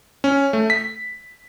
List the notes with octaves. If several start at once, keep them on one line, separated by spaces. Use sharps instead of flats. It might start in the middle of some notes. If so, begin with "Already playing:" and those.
C#4
A3
B6